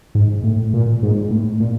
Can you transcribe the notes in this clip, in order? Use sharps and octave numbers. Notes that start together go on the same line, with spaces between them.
G#2
A2
A#2
G#2
A2
A#2